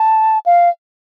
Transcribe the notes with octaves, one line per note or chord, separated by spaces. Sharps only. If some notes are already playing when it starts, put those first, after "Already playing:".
Already playing: A5
F5